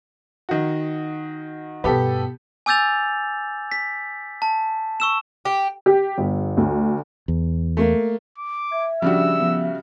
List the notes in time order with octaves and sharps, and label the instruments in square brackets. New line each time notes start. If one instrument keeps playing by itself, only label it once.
[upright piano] D#3 F#4
[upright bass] G2 B2 [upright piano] B3 G4 A4
[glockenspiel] G#5 D6 E6 G6 A6 F7
B6
A5
C#6 E6 E7
[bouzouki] G4
[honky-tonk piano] G4
G1
D2
[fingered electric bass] E2
[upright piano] A3 A#3
[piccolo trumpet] D6
[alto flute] E5 [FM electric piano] G#6
[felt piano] C#3 G3 F#4 [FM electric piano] F3 D4 [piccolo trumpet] E6
[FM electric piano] F3 B3